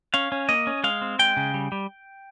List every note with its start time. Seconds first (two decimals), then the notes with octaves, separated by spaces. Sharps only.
0.14 C#4 F5
0.32 C#4
0.49 A#3 D#5
0.67 C#4
0.84 G#3 F5
1.02 C4
1.19 G#3 G5
1.37 C#3
1.54 G3
1.72 G3